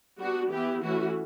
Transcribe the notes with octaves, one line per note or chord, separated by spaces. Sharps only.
G3 B3 D4 F#4
E3 B3 E4 G4
E3 A3 C#4 E4 F#4